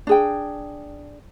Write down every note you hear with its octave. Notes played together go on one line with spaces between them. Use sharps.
D4 G#4 G5